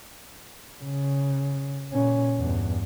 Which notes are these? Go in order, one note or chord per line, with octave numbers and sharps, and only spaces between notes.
C#3
A#2 C#4
E2 G2